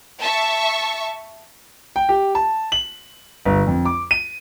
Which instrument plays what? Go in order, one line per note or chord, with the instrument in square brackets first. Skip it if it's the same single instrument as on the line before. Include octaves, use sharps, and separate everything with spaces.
[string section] E5 A5 C#6
[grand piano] G5
G4
A5
F#7
G1
F2
D6
D#7